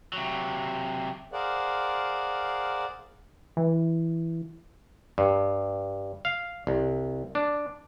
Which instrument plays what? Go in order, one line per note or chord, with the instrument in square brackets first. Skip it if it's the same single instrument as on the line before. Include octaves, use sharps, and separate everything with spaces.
[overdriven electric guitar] C3 F#3
[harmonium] G#4 A#4 C5 D5 F5 F#5
[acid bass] E3
[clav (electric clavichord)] G2
F5
C2
D4